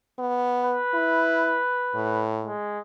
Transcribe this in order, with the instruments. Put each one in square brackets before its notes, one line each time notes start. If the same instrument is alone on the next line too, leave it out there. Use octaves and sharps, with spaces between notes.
[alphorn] B3
[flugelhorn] B4
[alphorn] E4
A2
[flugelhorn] G#3